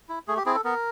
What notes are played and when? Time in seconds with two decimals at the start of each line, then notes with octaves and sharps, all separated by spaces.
0.09 E4
0.28 A3 G#4
0.37 G4
0.46 C4 E4 G#4
0.55 A4
0.64 B3 A#4